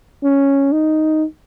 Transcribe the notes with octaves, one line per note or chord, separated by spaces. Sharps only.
C#4
D#4